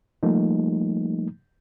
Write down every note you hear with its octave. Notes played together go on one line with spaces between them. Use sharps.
F3 G3 A3 A#3 D#4